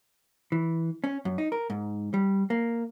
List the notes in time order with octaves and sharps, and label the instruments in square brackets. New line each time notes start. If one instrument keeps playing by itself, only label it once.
[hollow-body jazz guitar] E3
C#4
F#2
D#4
A#4
G#2
G3
A#3